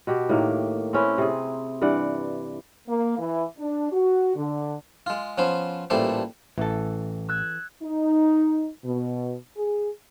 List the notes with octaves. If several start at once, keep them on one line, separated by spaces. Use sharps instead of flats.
B2 F#4 G4
A2 D#3 A#3
C4 C#4 E4 B4
C3 G#4
G2 E3 D5 F#5
A#3
E3
D4
F#4
D3
G#3 F4
F3 B3 C#4 C5
A1 A#2 G3 A3 A4 C5
A1 E3 A4
E6 F#6 G#6
D#4
B2
G#4